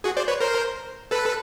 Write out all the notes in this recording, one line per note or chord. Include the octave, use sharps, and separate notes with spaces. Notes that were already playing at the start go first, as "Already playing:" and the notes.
F#4 G#4
C5 D5
B4 C#5
A#4 C5
A4 B4